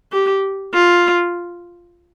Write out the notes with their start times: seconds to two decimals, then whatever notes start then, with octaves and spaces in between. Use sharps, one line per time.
0.12 G4
0.74 F4